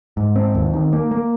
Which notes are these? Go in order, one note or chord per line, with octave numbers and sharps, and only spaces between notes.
G#2
C4
D#2
D#3
A#3
A#3